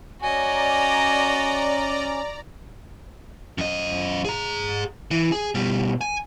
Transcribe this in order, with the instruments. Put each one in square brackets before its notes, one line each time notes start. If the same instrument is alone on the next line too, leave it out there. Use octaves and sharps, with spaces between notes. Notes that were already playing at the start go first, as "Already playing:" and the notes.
[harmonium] C#4 [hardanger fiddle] F#4 D#5 [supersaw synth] D5 A#5 [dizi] G#5
[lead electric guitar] F#2 D#5
G#4 A#5
E3
G#4
B2 G3
G#5